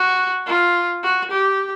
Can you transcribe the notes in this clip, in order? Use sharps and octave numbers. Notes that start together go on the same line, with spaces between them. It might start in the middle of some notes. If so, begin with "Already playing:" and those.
Already playing: F#4
F4
F#4
G4